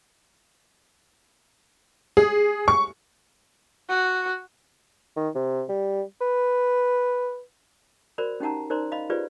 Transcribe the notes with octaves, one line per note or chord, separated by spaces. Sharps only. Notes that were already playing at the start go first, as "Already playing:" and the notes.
G#4
C#6
F#4
D#3
C3
G3
B4
F#4 A#4 C5 D5 B5
C#4 D#4 G4 F#5 A5 A#5
D#4 A#4 C5 D5 A#5 C6
D#5 F5 B5
F4 G4 G#4 B4 C5 D5